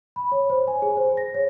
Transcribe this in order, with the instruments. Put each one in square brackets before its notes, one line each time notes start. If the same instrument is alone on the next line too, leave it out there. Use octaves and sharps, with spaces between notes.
[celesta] B5
C#5
C5
G#5
G#4
C5
A#6
C#5